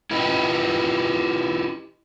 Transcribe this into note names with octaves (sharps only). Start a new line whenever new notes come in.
E4 F4 G4 B4 D#5